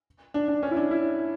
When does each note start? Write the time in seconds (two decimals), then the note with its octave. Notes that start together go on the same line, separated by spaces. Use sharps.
0.34 D4
0.48 D4
0.63 C#4
0.71 E4
0.77 D4
0.91 E4